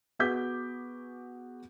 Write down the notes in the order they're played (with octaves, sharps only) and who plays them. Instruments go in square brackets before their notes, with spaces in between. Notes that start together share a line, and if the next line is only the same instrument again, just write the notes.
[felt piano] B3 F#4 G#4 D6 G6 B6